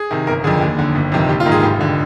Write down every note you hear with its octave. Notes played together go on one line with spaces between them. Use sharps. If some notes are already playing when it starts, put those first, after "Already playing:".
Already playing: G#4
C3 D#3
G1 A#4
F2 D3 G#4
D#2
D3
G1
F2 C3 D#3
A#1 G4
F4
G#2 D#3
G#4
F1 G4
D3